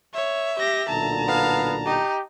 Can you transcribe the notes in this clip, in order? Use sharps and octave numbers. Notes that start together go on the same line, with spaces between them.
C#5 E5
G4 A#6
B1 A#2 D3 A5 A#5
B3 F5
D#4 G4